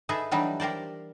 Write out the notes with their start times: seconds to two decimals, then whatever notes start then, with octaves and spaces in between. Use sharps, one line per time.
0.09 D#4 G#4 A4 B4 E5
0.31 E3 F#3 G3 D4 D#4
0.60 G4 A#4 C5 D5